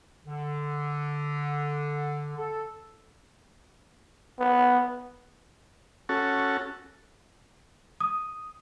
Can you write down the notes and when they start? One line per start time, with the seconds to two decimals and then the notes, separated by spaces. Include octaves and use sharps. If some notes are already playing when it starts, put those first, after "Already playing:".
0.27 D3
2.38 A4
4.39 B3
6.09 C#4 F#4 A4
8.00 D#6